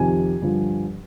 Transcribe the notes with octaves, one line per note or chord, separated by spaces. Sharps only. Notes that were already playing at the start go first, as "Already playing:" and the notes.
Already playing: F2 C3 D#3 G#5
G2 D3 F3